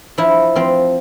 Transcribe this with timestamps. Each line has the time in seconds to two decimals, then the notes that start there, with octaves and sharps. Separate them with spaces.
0.18 F3 E4
0.56 F3 C4